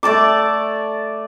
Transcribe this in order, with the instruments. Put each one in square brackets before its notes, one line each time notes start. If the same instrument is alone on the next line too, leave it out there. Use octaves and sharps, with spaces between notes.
[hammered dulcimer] A3 D5 A5 D6